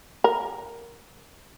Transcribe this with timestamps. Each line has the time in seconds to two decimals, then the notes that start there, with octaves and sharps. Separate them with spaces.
0.24 A#4